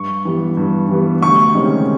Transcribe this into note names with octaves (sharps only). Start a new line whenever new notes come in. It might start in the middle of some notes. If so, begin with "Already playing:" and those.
Already playing: G2 C#6
E3 G3 B3
G2
E3 G3 B3
D2 C#6
C3 D#3 G#3 C#4